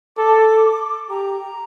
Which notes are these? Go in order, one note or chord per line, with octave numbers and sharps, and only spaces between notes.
A4 D6
G4 A#5